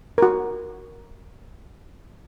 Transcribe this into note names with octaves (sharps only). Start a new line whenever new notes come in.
F#4 A#4